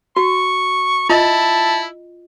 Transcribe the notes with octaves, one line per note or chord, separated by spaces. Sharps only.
F#4 C#6
E4 F4 D#5 A5